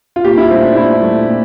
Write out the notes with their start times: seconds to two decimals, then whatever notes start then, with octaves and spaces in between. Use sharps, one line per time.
0.16 F4
0.24 A#2 G4
0.38 E4
0.51 A3 C4
0.63 D4
0.76 A#2 E4
1.02 A3
1.28 A#2